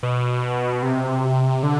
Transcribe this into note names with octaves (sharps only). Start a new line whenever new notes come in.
B2
C3
D3